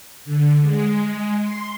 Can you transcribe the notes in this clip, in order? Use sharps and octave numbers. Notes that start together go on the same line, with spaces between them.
D3
G#3
C6